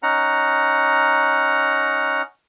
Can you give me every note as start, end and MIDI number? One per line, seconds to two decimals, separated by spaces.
0.03 2.22 61
0.03 2.22 63
0.03 2.22 78
0.03 2.22 82